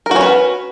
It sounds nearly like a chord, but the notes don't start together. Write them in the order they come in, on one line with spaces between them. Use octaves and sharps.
A#4 F#4 C#4 B4